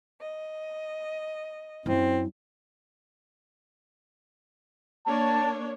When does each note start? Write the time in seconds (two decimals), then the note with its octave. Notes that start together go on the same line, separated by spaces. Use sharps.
0.22 D#5
1.86 F#2 F#3 C4 E4
5.07 A#3 D4 C#5 A5